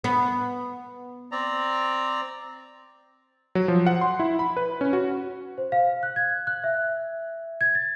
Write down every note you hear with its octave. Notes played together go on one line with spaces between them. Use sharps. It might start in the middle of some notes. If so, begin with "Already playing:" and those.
B3
C4 D5 A#5
F#3
F3
F#5
C6
E4
B5
B4
C#4
F#4
C5
F5
F#6
G#6
F#6
E5
G#6
A6